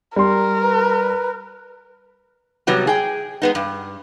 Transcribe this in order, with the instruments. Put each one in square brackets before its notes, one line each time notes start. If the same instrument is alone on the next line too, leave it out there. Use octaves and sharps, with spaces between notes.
[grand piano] G3 C6 [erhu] A#4
[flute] B4
[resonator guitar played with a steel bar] C3 F#3 G3 B3
G#4 G5
G#3 B3 D#4
G2